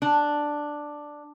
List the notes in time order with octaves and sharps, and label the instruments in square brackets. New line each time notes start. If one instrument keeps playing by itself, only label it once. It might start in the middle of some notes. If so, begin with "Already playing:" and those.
[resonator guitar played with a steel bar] D4